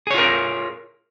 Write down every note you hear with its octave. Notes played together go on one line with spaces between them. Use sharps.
F4 G#4 A#4 C#5